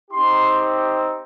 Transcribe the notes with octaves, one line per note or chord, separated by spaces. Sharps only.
C4 D#4 G4 C6